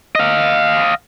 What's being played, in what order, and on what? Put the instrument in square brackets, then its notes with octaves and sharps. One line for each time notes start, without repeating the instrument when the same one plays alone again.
[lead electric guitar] D#5 F5